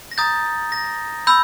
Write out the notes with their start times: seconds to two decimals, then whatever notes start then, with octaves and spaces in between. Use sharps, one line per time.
0.11 A#6
0.18 A#5 D#6 G6 A6
0.72 A#6
1.27 B5 E6 G6